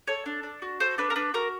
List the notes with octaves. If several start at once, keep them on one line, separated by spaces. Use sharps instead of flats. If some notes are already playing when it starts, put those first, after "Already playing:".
A4 C#5
D4
D4
F#4
A4 C5
D4 B4
A#4
D4 B4
F#4 A#4